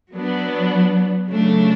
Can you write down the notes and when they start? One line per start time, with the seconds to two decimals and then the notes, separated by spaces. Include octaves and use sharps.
0.14 F#3 B3 D4
1.29 C#3 F#3 A3 D4